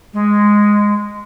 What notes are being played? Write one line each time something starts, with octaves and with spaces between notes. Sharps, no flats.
G#3